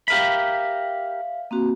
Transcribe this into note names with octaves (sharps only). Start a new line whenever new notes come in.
G4 A#4 E5 F5 B5
A#3 C4 F#4